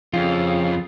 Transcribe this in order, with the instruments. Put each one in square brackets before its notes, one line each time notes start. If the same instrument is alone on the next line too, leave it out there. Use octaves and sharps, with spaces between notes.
[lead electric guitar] F2 [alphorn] C#3 [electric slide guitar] F4